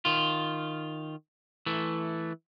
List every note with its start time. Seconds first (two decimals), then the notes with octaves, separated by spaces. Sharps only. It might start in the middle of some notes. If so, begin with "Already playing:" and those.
0.05 D#3 F4
1.66 E3 A3